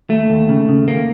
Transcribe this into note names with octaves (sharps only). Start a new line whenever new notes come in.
D#2 A3
D#2
C#3
C#3
D#2 A#3